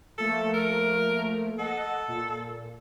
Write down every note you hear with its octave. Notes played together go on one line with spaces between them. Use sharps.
F3 A3 A#3 A4
A#4
A4 D#5 F#5
A#2